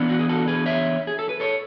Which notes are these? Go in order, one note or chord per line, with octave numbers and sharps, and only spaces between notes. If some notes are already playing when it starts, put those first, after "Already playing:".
Already playing: E3 B3 D4
F#4
G#4
F#4 A4
G#4 B4
C#5 E5
G#4
A4
B4
A4 C#5